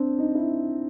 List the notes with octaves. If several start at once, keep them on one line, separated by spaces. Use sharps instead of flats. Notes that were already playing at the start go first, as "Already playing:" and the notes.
Already playing: C4 D4
D#4
E4